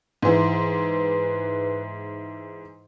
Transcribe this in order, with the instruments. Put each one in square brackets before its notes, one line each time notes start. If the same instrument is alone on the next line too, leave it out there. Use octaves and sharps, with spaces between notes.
[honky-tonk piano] G#2 E3 [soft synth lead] B4